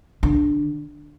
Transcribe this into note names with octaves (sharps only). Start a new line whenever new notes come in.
D3